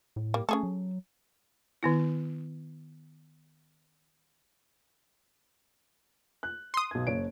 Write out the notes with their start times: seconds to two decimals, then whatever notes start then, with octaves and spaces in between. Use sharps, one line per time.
0.16 A2
0.34 G3 A#3
0.49 A3 C#4 G#4 A4
0.63 F#3
1.83 D#3 B3 E4
6.43 F#6
6.74 C6 D#6
6.91 B1 G#6
7.07 F#1 C#5 D7